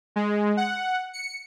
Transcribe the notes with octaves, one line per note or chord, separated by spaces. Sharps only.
G#3
F#5
C#7